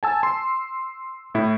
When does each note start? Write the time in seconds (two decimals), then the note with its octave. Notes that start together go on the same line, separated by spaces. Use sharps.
0.03 G#5 A5 E6
0.23 C6
1.35 A2 E4